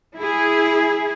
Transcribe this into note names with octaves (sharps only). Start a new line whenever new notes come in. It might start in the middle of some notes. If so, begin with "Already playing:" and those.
E4 G#4